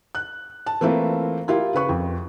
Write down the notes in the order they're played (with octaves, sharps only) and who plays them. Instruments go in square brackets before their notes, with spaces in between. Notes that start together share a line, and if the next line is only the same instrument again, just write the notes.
[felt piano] F#6
A5
E3 A3 A#3 C4 F4 B4
E4 F4 G4 A#4
C#3 B4 C#6
F2